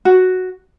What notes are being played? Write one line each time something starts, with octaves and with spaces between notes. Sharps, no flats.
F#4